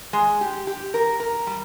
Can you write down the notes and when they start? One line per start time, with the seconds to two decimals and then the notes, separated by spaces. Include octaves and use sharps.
0.13 G#3
0.41 G4
0.67 G4
0.94 A#4
1.20 A#4
1.47 G3